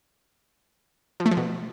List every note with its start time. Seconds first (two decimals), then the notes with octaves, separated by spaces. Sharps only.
1.20 F3
1.26 A3
1.31 F3
1.37 B2